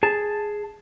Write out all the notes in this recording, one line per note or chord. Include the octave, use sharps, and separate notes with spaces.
G#4 A5